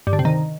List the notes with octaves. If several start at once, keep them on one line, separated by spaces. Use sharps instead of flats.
G2
D3
C3
D#3